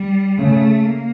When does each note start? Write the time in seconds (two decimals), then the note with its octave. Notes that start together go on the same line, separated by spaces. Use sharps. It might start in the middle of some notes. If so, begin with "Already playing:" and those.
Already playing: G3
0.38 C#3 A3
0.83 A#3